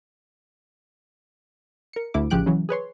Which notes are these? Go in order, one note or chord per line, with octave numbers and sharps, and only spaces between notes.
A#4 C#7
D2 E4 D6
A1 C#3 F3 G4 F#6 D7
C#3 E3 F#3
G#4 B4 C#5 C6